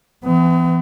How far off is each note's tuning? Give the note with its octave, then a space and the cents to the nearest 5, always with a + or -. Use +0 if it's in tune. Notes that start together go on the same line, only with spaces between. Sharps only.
E3 +25 B3 +45